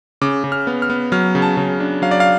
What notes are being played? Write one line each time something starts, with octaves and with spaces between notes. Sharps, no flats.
C#3 D6
C#3
F6
B3
F6
B3
F#3 F6
C#3
A5
C#3
D4
F#3 F5
D5
F5